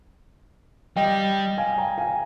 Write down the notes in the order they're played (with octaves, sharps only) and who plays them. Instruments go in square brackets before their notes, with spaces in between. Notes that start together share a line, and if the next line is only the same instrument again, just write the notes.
[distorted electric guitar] G3 [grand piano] D#5 G5
[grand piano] F5 G#5
G5 A#5
F5 G#5